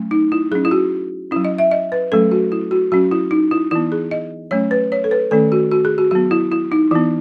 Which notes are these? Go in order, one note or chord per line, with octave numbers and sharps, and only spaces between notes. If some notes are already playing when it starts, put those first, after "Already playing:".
Already playing: F#3 A3 C#4
D#4
E4
F#3 C#4 G#4
E4
F#4
F#3 C#4 E4
D#5
E5
D#5
B4
F#3 A3 C#4 A4
F#4
E4
F#4
F#3 C#4 F#4
E4
D#4
E4
E3 B3 E4
G#4
D#5
F#3 A3 C#4 C#5
B4
C#5
A4
B4
D#3 A3 C#4 A4
F#4
F#4
G#4
F#4
F#3 B3 F#4
E4
E4
D#4
E3 B3 E4